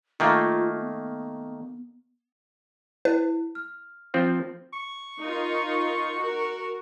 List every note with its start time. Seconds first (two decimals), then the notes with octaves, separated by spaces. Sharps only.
0.20 D#3 A3 A#3 F4
0.76 B3
3.05 E4 B4
3.55 F6
4.14 F3 C4 F4
4.73 C#6
5.19 D#4 F4 A#4
6.18 F#4 A#4